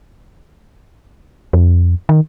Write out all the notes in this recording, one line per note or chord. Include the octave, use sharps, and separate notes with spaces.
F2
D#3